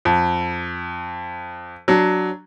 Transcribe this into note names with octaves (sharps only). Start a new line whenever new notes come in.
F2
F#3 D4